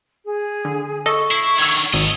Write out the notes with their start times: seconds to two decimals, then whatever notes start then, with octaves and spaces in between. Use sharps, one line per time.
0.25 G#4
0.65 D3
1.06 A4 D#5 C#6
1.31 E4 C7
1.59 D3 D#3 E6 G#6
1.93 G#1 A4 D#5